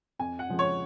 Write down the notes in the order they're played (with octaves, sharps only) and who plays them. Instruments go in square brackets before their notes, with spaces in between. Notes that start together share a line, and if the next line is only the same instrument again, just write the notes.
[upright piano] F2 G#5
F#5
C#3 F3 G#3
C#5